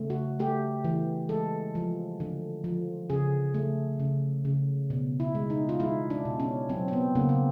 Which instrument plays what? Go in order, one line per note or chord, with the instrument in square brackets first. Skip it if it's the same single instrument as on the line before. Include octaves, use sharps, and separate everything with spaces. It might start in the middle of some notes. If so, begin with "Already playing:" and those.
Already playing: [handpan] C#3 A3
F#4
A3 G4
E3
G#3 A4
F3
D3
F3
C#3 G#4
A3
C#3
C#3
B2
E4
G#3
D#4
F4
G#3 E4
D4
B2
C#4
F#3 C4
C4
B3
C#3 A#3
C4